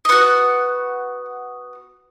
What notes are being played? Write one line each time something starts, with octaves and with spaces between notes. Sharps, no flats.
D#5
B3 F#4 F#5